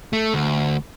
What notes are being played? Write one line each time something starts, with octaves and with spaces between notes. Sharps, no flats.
A3
D2